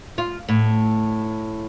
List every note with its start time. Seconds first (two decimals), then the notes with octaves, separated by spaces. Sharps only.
0.18 F4
0.48 A2